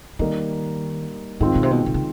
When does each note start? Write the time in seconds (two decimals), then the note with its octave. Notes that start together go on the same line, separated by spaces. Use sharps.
0.19 D#3 G3 A#3 D#4
1.40 A2 D#3 G#3 C4 F4
1.55 A#2
1.63 C3
1.71 B2
1.86 B2
1.94 C#3